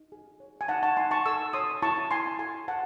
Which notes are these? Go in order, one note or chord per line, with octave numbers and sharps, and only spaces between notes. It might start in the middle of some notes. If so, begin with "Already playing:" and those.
Already playing: D#4
G#4
C#5
G#5
D#4 F#5 A5
A5 C#6
D#4 G#5 C6
A5 C#6
A4 C#6 E6
C#5 C6 D#6
E4 A5 C#6
E4 G#5 C6
A4 G#5 C6
C5 F#5 A5